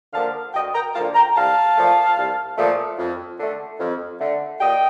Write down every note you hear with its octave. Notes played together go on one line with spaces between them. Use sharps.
D3 F3 A#3 F5 A5
D2 D#5 G5
G5 A#5
D3 F3 A#3 F5 A5
G5 A#5
C2 F5 A5
A#2 F3 A3
C2
A#2 F3 A3
F2
D3 A3
F2
D3 A3
A#2 D#5 G5